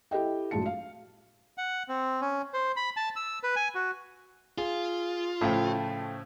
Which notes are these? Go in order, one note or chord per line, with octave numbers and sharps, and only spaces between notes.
E4 G4 A4 D#5 G5
A#1 F#3 G#3 A3 A5 C#7
F5
F#5
C4
C#4
C5
B5
A5
E6
B4
G#5
F#4
F4 G#4
A2 C#3 F3 A3 G5